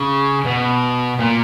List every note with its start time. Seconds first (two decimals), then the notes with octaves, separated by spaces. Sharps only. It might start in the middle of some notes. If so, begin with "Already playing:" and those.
Already playing: C#3
0.45 B2
1.19 A#2